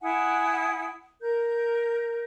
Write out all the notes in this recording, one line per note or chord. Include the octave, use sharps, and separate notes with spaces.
E4 F#5 G#5 D#6
A#4 G6